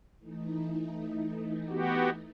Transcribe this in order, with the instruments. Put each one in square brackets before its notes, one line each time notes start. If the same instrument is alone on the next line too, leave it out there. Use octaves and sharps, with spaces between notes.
[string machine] E3 A3 D#4
[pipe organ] B3 F#4 G4